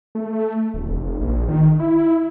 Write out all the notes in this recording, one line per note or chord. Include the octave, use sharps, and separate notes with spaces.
A3
D1
F1
A#1
D#3
E4